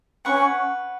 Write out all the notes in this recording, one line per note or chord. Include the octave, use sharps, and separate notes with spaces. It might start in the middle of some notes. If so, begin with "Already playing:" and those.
C#4 B4 F#5 C#6